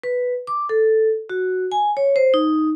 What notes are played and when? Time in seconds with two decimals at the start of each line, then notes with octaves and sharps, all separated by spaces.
0.04 B4
0.47 D6
0.69 A4
1.30 F#4
1.72 G#5
1.97 C#5
2.16 C5
2.34 D#4